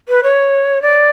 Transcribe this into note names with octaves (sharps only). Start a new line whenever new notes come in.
B4
C#5
D5